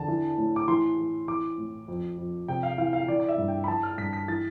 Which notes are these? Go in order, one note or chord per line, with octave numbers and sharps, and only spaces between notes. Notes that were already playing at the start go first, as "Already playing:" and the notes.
Already playing: E2 D3 A5
E3
A2
D6
E3 C6
E3
E3 D6
A2
F2
F2
C3 G5
F5
E3 F5
F5
E3 D5
D5
E5
G2
G5
B5
E3 A5
F6
G2 B6
B6
E3 A6